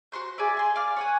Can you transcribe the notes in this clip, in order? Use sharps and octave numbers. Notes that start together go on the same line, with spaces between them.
F#4 C5 C6 G6
G#4 A4 D5 E5
G#5 C6
D5 F5 F6
C#5 F#5 G#5